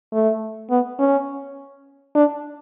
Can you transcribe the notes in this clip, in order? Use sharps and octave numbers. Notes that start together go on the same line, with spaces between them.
A3
B3
C#4
D4